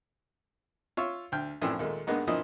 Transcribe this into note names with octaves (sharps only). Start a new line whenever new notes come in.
F4 C#5 E5
D2 G5 F6
F#2 A2 E3 F3 C4 D4
D#2 A#2 G#3 A3
G2 G#3 A#3 B3 D#4
G2 A#2 D#3 F3 E4 D#5